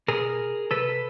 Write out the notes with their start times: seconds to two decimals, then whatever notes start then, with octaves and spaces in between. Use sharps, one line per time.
0.08 B2 G#4 A#4
0.71 C3 A4 B4